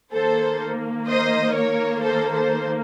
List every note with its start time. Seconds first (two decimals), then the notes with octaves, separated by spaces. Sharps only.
0.13 D#3 A#3 A4 C5
1.07 C5 D#5
1.54 A#4 C#5
2.01 A4 C5
2.32 A4 C5